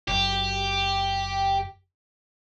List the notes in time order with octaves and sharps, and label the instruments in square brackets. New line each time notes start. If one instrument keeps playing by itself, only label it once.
[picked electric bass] F#1 F#2 [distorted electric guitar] G4